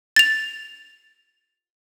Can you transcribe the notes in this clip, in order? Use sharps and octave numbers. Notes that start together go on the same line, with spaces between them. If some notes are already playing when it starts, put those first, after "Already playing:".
A6 F7